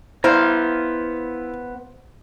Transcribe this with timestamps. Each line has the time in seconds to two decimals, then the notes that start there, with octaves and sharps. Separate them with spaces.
0.24 B3 E4 C5 F5 A#5